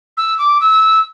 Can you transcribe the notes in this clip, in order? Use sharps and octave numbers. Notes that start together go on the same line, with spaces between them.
E6
D6
E6